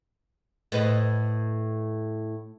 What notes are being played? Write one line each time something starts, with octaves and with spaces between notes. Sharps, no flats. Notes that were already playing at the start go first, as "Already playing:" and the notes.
A2 B4 D#5